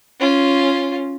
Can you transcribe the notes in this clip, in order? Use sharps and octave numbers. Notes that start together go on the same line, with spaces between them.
C#4 F4